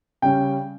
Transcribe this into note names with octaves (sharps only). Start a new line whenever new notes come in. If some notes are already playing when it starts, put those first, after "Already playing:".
C#3 G3 C#4 G5